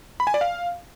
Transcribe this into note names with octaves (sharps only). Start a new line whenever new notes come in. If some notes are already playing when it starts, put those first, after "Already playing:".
B5
G#5
D5
F5